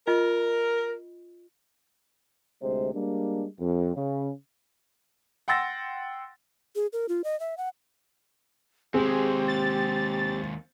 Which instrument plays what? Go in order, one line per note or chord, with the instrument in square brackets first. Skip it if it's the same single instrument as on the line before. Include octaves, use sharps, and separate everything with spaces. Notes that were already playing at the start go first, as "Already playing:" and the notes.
[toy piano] F4 D#5 [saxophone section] A#4
[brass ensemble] D2 C3 G#3 C5
G3 G#3 A#3 D4
F2
C#3
[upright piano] F#5 G5 C6 E6 A6 A#6
[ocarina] G#4
A#4
F4
D#5
E5
F#5
[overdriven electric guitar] D#2 G#3 [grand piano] C4 C5 [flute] G4 [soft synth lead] G#4
[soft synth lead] A6